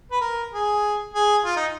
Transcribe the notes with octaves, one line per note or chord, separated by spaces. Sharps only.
B4
A#4
G#4
G#4
F4
D#4